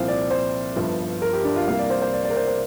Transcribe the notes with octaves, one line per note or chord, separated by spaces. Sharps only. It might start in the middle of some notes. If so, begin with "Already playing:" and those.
Already playing: C2 A#2 F3 C4 F5
D5
C5
G1 G2 F3
A#4
G4
D4
F4
C2 C3 G3 A#3 F5
D5
C5
C5
D5
D5
A#4
C5
C5